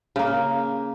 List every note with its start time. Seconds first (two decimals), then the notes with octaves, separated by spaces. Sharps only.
0.16 C#3 A#3